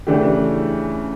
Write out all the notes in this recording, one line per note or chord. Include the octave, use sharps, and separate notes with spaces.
C#3 E3 A3 D4 G4